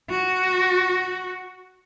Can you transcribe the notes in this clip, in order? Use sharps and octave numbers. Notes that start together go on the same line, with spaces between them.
F#4